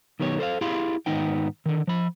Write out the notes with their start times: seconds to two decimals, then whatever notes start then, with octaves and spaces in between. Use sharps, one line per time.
0.20 B1 D#3 B3 G4 C#5
0.39 A4 C5 C#5 F5
0.61 E4 G4 G#4 F5 B5 C6
1.06 G#2 D#3 B3 D#4 G5
1.66 D3 D#3
1.87 F3 B5